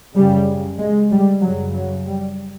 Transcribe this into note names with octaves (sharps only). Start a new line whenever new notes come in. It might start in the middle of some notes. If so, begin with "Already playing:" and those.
F#2 C#3 G3
G#3
G3
F#2 C#3 F#3
F#3
G3